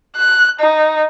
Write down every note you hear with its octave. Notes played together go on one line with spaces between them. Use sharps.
F#6
D#4